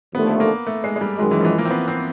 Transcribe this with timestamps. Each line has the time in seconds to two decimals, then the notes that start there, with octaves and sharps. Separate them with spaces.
0.14 D#2 D3 F3 A3 B3
0.40 A#3
0.67 A3
0.84 G#3
0.96 G#3
1.01 G3
1.18 F#2 D#3 F#3 G#3
1.31 E3
1.41 F3
1.45 E3
1.58 A#3
1.65 C4
1.71 B3
1.88 C4